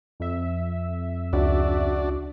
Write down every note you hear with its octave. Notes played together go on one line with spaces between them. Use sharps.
F2 E5
C#2 D4 F#4 D5